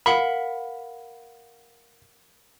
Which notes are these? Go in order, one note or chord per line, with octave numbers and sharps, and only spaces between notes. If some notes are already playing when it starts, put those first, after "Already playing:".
A#4 F5 F#5 B5